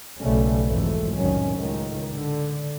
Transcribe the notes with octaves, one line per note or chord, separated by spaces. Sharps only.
B1 C#3 G3 A3 C#4
G#1 F2 E3 F#3 A3
C2 F2 A2 D#3 F#3 C#4
C#2 A2 D#3
D3